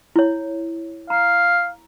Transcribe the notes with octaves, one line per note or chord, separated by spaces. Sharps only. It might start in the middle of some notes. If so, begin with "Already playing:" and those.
E4 C#5
F5 A#5